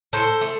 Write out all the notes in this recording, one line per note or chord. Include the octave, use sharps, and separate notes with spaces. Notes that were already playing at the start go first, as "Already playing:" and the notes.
A2 A4 C5
A3